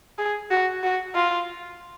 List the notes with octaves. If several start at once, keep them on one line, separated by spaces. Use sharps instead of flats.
G#4
F#4
F#4
F4